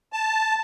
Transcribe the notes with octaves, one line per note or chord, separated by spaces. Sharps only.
A5